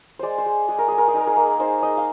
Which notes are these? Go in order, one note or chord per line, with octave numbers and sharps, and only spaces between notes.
G#3 C5 D5
C5
G#3
G#3 G#4
A#4
G#3 G#4
A#4
G#4
D#4 A#4
G#4
A#3
D#4 C5
D#4 D#5
F5